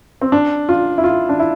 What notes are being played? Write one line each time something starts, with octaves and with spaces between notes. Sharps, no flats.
C4
D4
F4
E4
F4
D4
E4